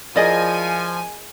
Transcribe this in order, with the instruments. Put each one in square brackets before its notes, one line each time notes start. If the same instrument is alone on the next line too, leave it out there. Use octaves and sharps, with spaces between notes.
[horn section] F3 [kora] E4 G#4 A#4 [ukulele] D5 D#5 [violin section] G#5